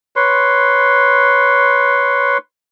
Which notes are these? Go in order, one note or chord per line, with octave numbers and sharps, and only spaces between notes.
B4 C#5 C6